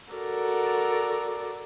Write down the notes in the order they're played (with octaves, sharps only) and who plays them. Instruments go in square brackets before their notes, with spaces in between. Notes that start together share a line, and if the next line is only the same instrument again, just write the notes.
[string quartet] F#4 A4 A#4 D5